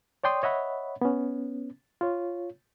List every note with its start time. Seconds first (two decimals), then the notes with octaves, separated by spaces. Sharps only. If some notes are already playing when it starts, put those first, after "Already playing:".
0.24 C#5 D5 G5 C6 D#6
0.43 C#5 D#5 E5 F#5 B5
1.02 B3 C#4
2.01 F4 C#5